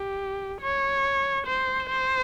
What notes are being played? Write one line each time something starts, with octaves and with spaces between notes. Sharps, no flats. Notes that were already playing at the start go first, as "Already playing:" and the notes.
Already playing: G4
C#5
C5
C5